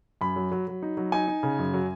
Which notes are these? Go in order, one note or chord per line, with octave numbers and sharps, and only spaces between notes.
F#2 B5
F#3
F#3
F#3
D#4
F#3
D#4 G#5
D#4
C#3
F#2
F#3